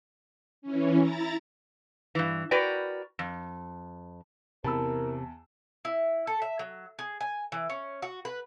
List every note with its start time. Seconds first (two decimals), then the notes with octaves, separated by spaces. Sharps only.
0.62 E3 C#4
0.98 E4 A#5 A6
2.15 G2 E3
2.51 F#4 A#4 B4 D5 G5
3.19 F2
4.64 E2 C3 E4 A#4 A5 B5 E6
5.85 E4
6.27 A4
6.42 E5
6.59 F#3
6.99 G#4
7.21 G#5
7.52 E3
7.70 C#4
8.02 F#4
8.25 B4